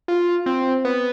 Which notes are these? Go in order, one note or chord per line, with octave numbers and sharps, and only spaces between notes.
F4
C4
B3